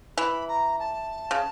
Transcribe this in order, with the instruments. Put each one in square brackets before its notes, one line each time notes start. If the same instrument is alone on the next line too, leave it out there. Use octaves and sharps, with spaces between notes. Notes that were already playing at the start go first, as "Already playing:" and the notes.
[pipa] E3 [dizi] B5
[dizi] A#5
A5
[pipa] C#3